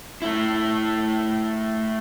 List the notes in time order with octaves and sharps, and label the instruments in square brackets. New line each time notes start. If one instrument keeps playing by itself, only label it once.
[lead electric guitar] A3 E4